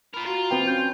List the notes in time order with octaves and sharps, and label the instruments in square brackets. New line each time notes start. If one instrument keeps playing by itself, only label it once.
[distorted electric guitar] F4 A#4 [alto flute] B5
[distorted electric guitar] F4 [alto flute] F#4 [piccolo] A#5
[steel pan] C4 B4 G5
[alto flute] C#4 [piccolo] G6